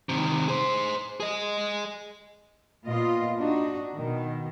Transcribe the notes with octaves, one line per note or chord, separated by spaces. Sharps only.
C3 D#3
G#4 C5
G#4 D#5
A#2 B3 F4 D#5
D4 D#4 F#4
B2 D#3